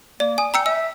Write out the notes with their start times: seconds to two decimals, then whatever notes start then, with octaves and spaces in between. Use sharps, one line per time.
0.20 A#3 D5
0.38 G#5 D#6
0.54 G5 A#5 E6 C#7
0.66 E5 E6